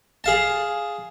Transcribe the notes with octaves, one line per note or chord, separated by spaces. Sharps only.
G#4 F5 A5